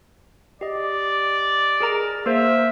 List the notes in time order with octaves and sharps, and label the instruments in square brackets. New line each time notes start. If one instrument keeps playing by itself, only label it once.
[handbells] G4 D#5 [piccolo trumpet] D5
[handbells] G#4 A#4 A#5
[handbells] A#3 A#4 C5 [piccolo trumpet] E5